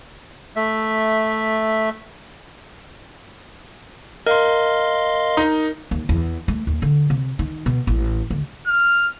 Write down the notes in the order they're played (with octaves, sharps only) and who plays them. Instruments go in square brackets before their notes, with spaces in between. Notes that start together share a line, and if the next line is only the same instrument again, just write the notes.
[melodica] A3 E5
[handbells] A#4 [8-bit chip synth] D#5 F5 C6
[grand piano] D#4
[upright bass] D#2
E2
A3
D#2
D3
C3
D#3
B2
A1
D2
[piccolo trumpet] F6